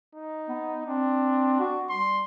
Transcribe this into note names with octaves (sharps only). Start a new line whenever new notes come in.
D#4
B3
C4 D4
F#4
G3 C6